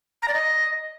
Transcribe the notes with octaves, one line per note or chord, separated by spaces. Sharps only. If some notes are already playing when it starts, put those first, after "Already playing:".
A#5
D5
D#5